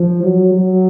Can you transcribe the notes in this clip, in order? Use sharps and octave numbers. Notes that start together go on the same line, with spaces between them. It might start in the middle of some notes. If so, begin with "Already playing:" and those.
Already playing: F3
F#3
F#3